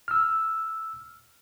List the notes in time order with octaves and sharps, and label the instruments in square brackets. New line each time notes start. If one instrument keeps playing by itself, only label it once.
[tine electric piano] E6 F6